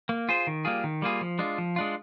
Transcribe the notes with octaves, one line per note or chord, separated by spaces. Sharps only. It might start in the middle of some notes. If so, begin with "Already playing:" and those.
A#3
F4 G#4 C5
D#3
G3 A#3 F4 G#4
D#3
G3 A#3 F4 G#4
F3
G#3 D4 F4
F3
G#3 D4 F4